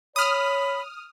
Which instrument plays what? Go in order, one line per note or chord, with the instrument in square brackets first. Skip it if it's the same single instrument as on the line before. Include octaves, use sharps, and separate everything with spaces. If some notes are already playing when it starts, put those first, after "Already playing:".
[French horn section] C#5 [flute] B5 [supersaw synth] D#6 F6